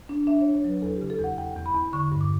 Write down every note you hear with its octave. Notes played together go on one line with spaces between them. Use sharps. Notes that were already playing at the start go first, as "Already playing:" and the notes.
D4
D4 E5
C#5
D4
C#5
F#3 B4
E2 A4
G4
C#3
A4
E2
F#5
E2 G5
E2
B5
E2
D3 C#6
G2
D6